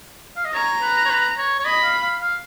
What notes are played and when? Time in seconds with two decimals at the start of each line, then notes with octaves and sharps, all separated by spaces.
0.36 F5
0.45 D#5
0.54 C#5 A#5
0.81 B4
1.05 C#5
1.09 B4
1.38 C#5
1.59 C#5
1.65 D#5 B5
1.83 F5
2.03 F5
2.21 F5